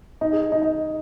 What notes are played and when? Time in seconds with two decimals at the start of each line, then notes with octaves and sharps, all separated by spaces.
0.21 D#4
0.32 G#4
0.42 G#4
0.52 D#4
0.62 D#4